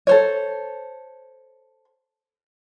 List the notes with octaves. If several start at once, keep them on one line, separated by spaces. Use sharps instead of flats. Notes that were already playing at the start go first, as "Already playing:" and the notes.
A4 C5 C#5